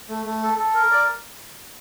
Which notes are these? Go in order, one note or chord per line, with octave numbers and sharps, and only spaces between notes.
A3
A3
A4
A4
A#4
D5